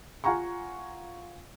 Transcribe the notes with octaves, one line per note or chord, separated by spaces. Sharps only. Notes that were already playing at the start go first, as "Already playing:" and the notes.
F4 F5 F#5 G#5 A#5 C#6